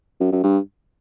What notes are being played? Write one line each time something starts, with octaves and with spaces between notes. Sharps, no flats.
F#2
F#2
G2